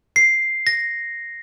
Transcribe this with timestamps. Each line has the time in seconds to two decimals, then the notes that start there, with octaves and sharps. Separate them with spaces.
0.16 C7
0.67 A#6